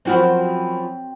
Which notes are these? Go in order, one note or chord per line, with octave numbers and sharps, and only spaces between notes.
F#2 F3 C4 F#4 A#4 B5